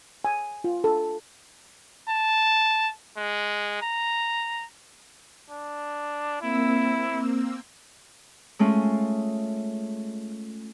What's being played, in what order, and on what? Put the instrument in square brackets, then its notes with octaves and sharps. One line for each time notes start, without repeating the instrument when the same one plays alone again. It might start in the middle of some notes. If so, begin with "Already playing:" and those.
[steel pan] G#5
F4
A4
[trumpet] A5
G#3
A#5
D4
[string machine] A#3 C4 E6 [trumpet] E4
[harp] G#3 A3 C#4 F4